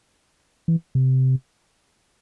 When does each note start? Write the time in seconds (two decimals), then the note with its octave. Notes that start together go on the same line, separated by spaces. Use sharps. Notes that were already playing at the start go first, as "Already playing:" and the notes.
0.68 E3
0.95 C3